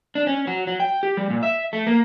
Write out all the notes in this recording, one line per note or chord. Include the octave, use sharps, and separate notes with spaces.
D4
C#4
F#3
F#3
G5
G4
G3
A#2
E5
A3
A#3